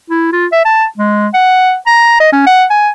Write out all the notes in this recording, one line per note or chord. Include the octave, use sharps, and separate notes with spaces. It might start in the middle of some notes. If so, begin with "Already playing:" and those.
E4
F4
E5
A5
G#3
F#5
A#5
D#5
C#4
F#5
G#5